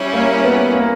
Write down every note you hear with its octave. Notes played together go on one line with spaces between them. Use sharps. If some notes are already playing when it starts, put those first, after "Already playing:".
Already playing: G3 C#4 E4
A#3
B3
A#3